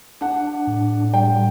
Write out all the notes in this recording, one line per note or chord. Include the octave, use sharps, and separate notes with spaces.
D4 F#5
A2
G3 G5